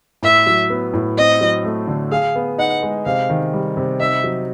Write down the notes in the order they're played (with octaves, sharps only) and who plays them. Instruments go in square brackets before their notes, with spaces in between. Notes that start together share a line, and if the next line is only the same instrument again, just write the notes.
[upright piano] A2 [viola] E5
[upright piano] F#3
B3
A2
[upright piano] C4 [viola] D#5
[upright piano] F#3
A3
D3
[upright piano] G#4 [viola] F5
[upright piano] B3
[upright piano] D#4 [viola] F#5
[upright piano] G#3
[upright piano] C3 [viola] F5
[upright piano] D#3
G3
C3
[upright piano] D#4 [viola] E5
[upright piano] F#3